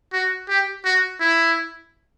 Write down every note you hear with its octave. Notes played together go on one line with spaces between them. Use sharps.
F#4
G4
F#4
E4